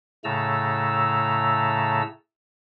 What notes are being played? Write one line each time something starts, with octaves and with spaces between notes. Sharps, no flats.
A2 C#3 A3 A5 A#5 E6